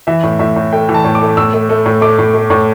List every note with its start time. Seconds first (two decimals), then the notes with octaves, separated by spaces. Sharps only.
0.07 E3 E5
0.23 A2
0.39 A2 E5
0.56 A2
0.73 A3 G5
0.89 E3
0.94 A5
1.05 A2
1.15 D6
1.21 A3
1.37 A2 E6
1.54 A3
1.69 A3
1.86 A2
2.01 A3 D6
2.19 A2
2.34 A3
2.50 A2